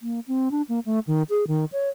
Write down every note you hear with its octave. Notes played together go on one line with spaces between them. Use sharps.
A#3
C4
D4
A#3
A3
D#3
G#4
D#3
C#5